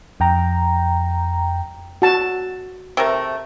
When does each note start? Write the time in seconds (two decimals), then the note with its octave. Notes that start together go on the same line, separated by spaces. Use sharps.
0.20 F2 G5 A#5
2.02 F#4 A5
2.97 C3 A3 A#4